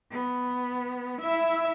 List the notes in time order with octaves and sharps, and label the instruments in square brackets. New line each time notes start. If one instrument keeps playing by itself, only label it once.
[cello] B3
[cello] E4 [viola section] E5